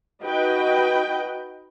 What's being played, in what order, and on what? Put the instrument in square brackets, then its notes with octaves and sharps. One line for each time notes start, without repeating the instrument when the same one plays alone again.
[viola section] D#4 F#4 B4 D#5 G5